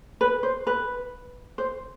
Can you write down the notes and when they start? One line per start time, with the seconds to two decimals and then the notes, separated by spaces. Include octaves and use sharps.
0.21 B4
0.43 C5
0.67 B4
1.58 C5